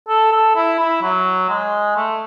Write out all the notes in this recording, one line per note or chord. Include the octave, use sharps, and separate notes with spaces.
A4
A4
E4
E4
F#3
G#3
A3